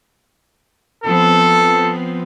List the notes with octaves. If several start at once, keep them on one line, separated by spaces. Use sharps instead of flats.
F3 B3 C4 A4